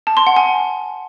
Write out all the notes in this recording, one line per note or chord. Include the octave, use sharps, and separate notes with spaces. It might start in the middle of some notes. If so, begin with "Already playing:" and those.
A5
C6
F#5
G#5